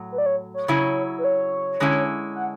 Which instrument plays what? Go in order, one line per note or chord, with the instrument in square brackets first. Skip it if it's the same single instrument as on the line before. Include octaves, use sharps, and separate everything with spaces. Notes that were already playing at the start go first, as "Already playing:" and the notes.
Already playing: [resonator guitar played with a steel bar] A2 F#3
[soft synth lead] B4
D5
C#5
C#5
[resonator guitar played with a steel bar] C#3 F#3 C#4 E4
[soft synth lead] B4
C#5
[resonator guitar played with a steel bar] D3 G#3 C#4 E4
[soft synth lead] F#5